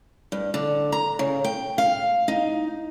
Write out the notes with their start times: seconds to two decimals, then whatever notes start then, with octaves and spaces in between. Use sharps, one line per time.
0.32 G2
0.54 D3
0.92 A#5
1.19 C#3
1.44 G5
1.78 F5
2.28 D#4